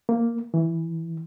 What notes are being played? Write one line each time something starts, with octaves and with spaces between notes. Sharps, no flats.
A#3
E3